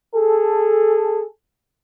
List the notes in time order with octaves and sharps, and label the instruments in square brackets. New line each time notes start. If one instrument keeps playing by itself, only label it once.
[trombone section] G#4 A4